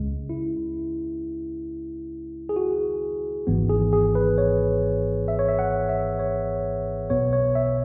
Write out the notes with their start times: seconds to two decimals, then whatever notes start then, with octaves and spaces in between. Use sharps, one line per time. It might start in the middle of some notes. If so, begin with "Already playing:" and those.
Already playing: C#2 C#3 G#3
0.30 E4
2.49 G#4
2.56 F#4
3.47 G#1 G#2 E3 B3
3.69 G#4
3.93 G#4
4.15 B4
4.38 C#5
5.28 E5
5.39 C#5
5.49 E5
5.59 F#5
5.89 E5
6.19 C#5
7.10 B1 B2 B3 C#5
7.33 C#5
7.55 E5